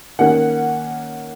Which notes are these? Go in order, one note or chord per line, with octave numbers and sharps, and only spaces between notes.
D#3 A#3 C#4 F#5